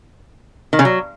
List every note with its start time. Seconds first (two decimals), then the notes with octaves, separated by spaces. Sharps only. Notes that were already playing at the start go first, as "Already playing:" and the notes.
0.73 D#3
0.79 C#3
0.85 F#3